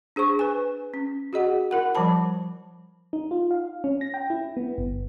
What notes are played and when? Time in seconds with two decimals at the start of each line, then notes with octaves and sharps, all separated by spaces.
0.16 D4 G#4 C5 C#6
0.39 B4 G#5
0.94 C#4
1.33 F#4 G#4 D#5 F#5
1.71 E4 A#4 F#5
1.95 F3 G3 C5 A5 B5
3.13 D#4
3.31 F4
3.51 F5
3.84 C#4
4.01 A#6
4.14 G5
4.30 E4
4.57 B3
4.78 G1